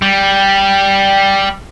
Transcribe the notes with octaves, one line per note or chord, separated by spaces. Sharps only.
G3